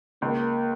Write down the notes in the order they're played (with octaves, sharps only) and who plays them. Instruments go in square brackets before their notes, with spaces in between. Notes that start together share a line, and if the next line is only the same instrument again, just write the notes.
[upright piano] C#2 [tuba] A#3